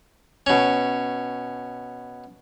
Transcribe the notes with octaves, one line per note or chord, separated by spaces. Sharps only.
B2 C#4